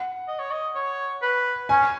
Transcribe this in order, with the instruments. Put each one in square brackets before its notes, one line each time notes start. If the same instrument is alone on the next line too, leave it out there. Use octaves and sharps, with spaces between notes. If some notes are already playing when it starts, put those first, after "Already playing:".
Already playing: [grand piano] F#5
[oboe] D#5
C#5
D#5
C#5
B4
[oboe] C#4 [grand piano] G#5